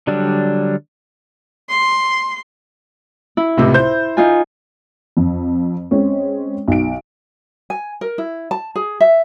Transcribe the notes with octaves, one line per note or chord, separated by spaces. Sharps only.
D3 F#3 G3 D4
C6
E4
C#2 A2 C3
C5 G6
D#4 F4 G#5
F2
G#3 C4 C#4
B1 D7
G#5
A#4
E4
A5
G#4
E5